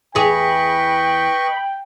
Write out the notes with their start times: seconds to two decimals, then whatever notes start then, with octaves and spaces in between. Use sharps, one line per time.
0.15 E2 G4 G#4 B4 D#5 G5 B5 C#6